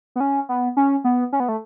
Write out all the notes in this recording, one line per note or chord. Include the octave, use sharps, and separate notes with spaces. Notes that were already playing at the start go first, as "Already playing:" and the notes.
B3
C#4
B3
C#4
B3
C#4
B3
A3